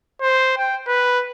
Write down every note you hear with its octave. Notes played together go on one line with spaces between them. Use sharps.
C5
G5
B4